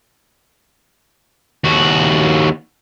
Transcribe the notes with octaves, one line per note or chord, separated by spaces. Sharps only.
D#2 F#4